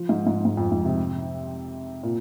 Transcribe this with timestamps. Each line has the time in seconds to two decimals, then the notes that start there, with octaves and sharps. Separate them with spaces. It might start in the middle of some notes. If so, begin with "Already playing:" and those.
Already playing: F3
0.09 G#2
0.27 G#2
0.45 G#2
0.57 F2
0.72 G#2
0.85 C3
2.03 A#2